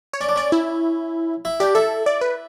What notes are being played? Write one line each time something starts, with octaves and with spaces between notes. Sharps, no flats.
C#5
C#4 D5
D4
C#4 D5
E4
E4
D4 G4
E4 A4
D5
B4